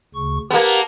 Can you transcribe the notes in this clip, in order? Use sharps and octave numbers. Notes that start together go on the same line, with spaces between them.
D2 C#3 C#6
A#3 B3 G4 A5